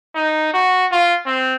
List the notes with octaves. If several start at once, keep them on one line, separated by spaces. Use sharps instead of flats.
D#4
F#4
F4
C4